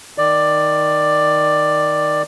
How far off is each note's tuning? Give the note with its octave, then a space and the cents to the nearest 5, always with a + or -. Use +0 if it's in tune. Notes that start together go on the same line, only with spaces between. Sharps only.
D#3 +0 D5 +10